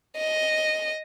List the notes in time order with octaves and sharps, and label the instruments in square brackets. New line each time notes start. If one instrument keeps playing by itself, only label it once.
[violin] D#5